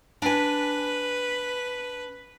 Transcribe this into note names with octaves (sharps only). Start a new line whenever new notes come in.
D4 B4 G#5